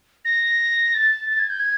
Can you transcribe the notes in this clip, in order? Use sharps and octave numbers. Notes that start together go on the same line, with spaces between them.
A#6
A6
A6
G#6
G6
G#6